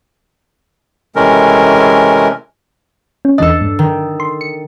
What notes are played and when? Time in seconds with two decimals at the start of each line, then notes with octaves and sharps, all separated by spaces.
1.16 C3 E3 G#3 A3 C#4 A#4
3.25 C#4
3.38 E2 E3 D4 A4 D#5
3.61 G2
3.79 D#3
4.20 C6
4.41 C#7